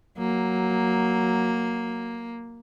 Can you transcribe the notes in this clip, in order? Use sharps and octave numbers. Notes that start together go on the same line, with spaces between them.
F#3 A#3